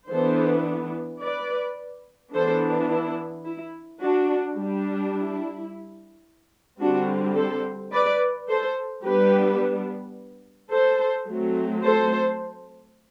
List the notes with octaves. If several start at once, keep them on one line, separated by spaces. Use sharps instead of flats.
E3 B3 D4 A4 C5
B4 D5
E3 B3 D4 A4 C5
E4
E4
D4 F#4
G3 D4
E4
D3 G3 C4 D4 F#4
A4 C5
B4 D5
A4 C5
G3 B3 D4 G4 B4
A4 C5
F#3 A3 C4
A4 C5